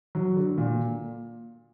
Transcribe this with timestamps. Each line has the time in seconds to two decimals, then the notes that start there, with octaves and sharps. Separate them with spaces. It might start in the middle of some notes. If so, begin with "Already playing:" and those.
0.15 F#3
0.36 D3
0.58 A#2